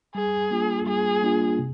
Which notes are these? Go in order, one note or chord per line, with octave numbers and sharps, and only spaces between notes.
G3 G#4
A#3 D4 F4
G3 G#4
A#3 D4 F4
C3